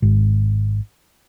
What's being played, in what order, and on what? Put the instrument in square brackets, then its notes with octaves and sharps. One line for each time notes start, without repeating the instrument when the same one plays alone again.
[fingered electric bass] G#1